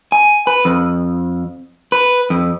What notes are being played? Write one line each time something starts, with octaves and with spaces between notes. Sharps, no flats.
G#5
B4
F2
B4
F2